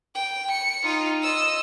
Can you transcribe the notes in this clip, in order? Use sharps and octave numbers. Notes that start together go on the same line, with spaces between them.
G5
C#7
D#4 F4
D#5 E6